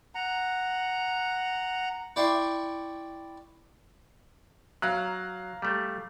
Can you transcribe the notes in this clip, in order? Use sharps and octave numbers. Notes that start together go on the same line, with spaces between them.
F#5 A#5
E4 D5 E5 G5 C6 C#6
F#3 F5 A#5 F#6
G3 A3